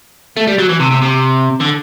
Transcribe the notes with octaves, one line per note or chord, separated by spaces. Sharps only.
A3
G3
F#3
E3
C3
C3
C3
D3